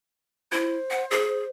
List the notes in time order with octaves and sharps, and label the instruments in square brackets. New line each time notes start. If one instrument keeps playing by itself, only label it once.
[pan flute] E4 [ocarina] C5
[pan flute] F#5
G#4